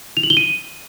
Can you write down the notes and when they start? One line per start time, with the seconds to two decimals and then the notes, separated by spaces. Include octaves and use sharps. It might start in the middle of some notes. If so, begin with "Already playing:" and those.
0.17 F7
0.23 F#7
0.30 G7
0.37 D#7